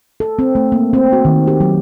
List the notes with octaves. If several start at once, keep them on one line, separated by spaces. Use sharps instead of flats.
A4
C4
A3
A#3
C4
F#4
D#3
G4
F#3